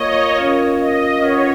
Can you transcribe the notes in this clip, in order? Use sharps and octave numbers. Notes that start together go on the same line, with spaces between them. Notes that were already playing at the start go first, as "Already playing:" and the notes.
Already playing: A#3 F4 A#4 C#5 D#5 F5
C#4 F4 A#4 F5
D#5
C#4 F4 B4 C#5 F#5